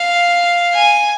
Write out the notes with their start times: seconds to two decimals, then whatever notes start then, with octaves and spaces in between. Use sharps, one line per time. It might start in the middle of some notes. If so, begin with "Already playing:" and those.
Already playing: F5
0.74 G#5